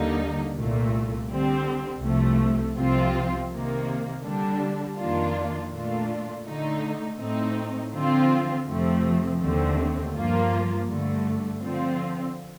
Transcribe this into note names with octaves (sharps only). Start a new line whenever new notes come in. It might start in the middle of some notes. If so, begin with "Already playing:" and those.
Already playing: D#2 D3 G3 A#3 D#4
C2 A#2 A3
D3 G3 C4
C2 C3 F3 A3
C2 C3 F3 C4 F4
C3 D#3 A#3
D3 G3 D4
F2 D#3 A#3 D4 F4
A#2 A3 D4 F4
D3 A3 D#4
A2 A3 C4 D#4
D3 F3 C4 F4
F2 C3 F3 A3 C4
D#2 D3 A3 C4
G2 F3 A#3 F4
G2 D3 A3
D3 F3 C4 F4